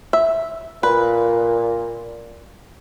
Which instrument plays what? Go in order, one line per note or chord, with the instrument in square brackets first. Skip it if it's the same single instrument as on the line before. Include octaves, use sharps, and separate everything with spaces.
[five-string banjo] E5
[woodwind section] A#2 [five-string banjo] B4